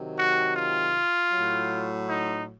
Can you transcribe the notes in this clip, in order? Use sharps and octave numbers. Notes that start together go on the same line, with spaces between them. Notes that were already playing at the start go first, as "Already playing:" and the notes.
Already playing: C3 D#3 F#3
F#4
F4
A2 F#3
D#4